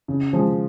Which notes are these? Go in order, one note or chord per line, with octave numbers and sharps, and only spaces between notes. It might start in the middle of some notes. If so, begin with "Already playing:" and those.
C#3
F3 G#3